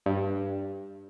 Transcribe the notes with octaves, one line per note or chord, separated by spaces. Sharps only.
G2